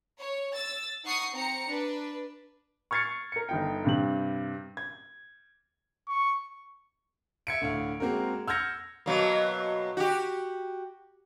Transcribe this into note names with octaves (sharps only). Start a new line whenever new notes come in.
C#5
E6 A6
D#4 F#5 C#6 D#6 C7 C#7
C4 A#5 C#7
D4 B4
C#6 F6 G#6 A6 C7 C#7
A#4 C#7
G1 D#4 G5
G2 C3 F#7
G#6
C#6
E5 G#6 C#7 D7
D2 A2 F5
G#3 A#3 C4 F#4 A#4
E6 F6 G6 G#6 A#6 C#7
B2 F#3 A#3
F#4 G4